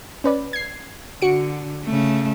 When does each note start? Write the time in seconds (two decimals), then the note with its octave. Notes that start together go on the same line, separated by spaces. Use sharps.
0.24 C#4 B4 D5
0.53 G#6 C7
1.22 D3 F#4 C#7 D7
1.85 C#3 A3